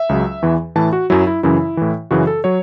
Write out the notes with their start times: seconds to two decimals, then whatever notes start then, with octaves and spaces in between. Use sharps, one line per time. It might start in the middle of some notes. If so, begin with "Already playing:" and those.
Already playing: E5
0.09 C#2 C#3 F#3
0.42 E2 E3
0.76 A2 E3 A5
0.93 F#4
1.10 F#2 F#3 E4
1.27 E4
1.43 F#2 C#3 E3 E4
1.77 A2 E3
2.11 F#2 C#3 E3 F#4
2.27 A4
2.44 F#3 C#5